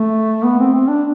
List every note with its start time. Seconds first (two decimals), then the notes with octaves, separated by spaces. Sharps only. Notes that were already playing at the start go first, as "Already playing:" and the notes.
Already playing: A3
0.45 B3
0.60 C4
0.74 C4
0.88 D4